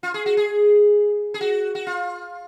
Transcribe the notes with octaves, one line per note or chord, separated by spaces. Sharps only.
F4
G#4
F#4
G#4
G#4
F#4
F#4
F4